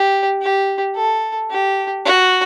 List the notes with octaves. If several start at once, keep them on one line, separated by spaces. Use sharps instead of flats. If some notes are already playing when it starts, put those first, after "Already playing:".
Already playing: G4
G4
A4
G4
F#4